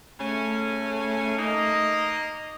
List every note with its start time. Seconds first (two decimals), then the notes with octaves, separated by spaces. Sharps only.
0.19 C#3 A3 C#4
1.38 A#3 D#4 D#5